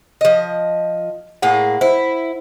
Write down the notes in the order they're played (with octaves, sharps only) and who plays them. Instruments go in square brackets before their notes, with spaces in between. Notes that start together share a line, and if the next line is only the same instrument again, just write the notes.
[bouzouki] F3 D#5
[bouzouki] A2 A#3 G#4 [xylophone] F#5
[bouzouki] E4 [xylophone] C5